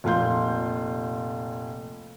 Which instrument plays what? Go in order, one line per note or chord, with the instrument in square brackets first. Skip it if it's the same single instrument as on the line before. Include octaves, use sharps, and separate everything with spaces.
[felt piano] F1 A#2 F4 F5 C6 G6